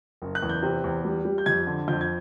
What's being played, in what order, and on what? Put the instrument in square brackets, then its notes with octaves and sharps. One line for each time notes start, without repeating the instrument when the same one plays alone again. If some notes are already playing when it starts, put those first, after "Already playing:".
[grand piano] F#1
F#6
E2
G6
C3
E2
G3
G3
G6
F2 G#6
D3
F2 G6
G#6